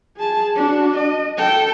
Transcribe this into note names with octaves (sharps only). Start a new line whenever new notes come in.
G#4 A5
D4 F#4
D#5
A4 G5